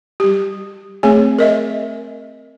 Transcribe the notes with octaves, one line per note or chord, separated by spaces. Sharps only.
G3 G4
A3 C4 G#4 C#5 G#5
A#4 D#5 E5